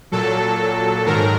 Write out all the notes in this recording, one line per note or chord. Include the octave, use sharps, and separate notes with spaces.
A#2 F#3 A4
G#2 D#3 F#3 A#4